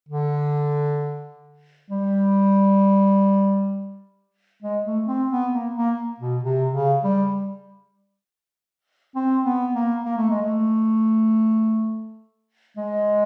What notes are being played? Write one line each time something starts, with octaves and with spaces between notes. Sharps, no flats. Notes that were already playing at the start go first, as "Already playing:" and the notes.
D3
G3
G#3
A3
C4
B3
A#3
A#3
B2
C3
C#3
G3
C4
B3
A#3
A#3
A3
G#3
A3
G#3